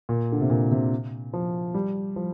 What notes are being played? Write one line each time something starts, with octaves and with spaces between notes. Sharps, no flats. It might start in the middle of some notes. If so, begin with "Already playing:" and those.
A#2
D3
C3
A#2
C3
F3
G3
F3